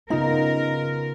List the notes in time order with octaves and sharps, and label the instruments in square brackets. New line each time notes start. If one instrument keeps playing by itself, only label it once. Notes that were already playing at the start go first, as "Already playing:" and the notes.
[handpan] C#3 B3 F4 [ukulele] D#4 [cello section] A#4